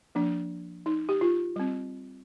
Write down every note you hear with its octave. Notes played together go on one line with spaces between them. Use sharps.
F3 A#3 D4
D#4
G4
F4
G3 C4